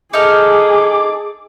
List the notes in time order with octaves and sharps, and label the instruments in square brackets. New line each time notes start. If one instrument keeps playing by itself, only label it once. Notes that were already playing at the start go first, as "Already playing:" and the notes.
[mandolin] D#4 A4 F6 [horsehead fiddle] G#4 [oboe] D6